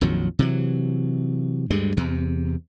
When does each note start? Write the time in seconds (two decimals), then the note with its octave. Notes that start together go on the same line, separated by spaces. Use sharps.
0.01 A#1 F2 D#3 F#3
0.39 C3 E3 F#3
1.70 D2 G2 G3 G#3
1.97 E2 C3